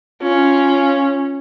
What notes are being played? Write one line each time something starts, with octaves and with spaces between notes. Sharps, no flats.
C#4 F4